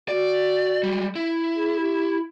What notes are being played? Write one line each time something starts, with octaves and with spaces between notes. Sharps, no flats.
F#4 D5
G3 G#3
E4
G#4
G4